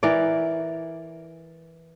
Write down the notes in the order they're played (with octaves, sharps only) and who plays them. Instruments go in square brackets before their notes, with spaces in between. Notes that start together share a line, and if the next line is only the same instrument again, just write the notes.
[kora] E3 A#4 D5